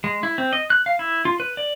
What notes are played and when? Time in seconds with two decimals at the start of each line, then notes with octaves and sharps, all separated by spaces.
0.04 G#3
0.23 E4
0.38 C4
0.53 D#5
0.70 F#6
0.86 F5
0.99 E4
1.25 F4
1.40 B4
1.57 D5